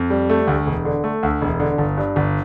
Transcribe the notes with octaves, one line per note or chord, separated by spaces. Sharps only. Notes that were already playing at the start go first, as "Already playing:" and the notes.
Already playing: F2
G3
A3
D2
E1
D3
A3
D2
E1
D3
G1
G2
G1